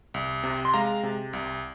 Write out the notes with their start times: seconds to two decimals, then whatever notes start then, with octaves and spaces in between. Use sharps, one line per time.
0.14 C2
0.43 C3
0.65 C6
0.74 G#3 F5 A#5
1.03 C3
1.33 C2